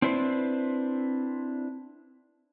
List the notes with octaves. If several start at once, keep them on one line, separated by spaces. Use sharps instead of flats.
C4 D4 E4 B4 C5